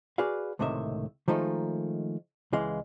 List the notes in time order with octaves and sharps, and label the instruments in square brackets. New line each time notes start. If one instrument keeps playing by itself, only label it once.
[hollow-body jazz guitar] F#4 G#4 B4 D5 F5
C#2 A2 C3 D#3 D#5 E5
D#3 F3 G#3 A3 D#4
C#2 E3 G#3 F5